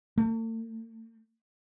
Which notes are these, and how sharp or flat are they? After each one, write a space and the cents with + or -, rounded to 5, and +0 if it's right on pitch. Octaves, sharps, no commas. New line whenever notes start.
A3 +45